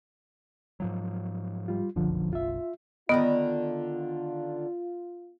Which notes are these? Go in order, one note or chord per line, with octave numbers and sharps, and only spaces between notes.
G#2 F3 F#3
G3 F4
F#1 B1 F2 D3 F3
F4 E5
D3 D#3 B3 F4 B4 D#5